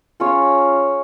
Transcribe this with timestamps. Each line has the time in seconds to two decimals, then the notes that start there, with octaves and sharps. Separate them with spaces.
0.20 C#4 F4 G#4 C#5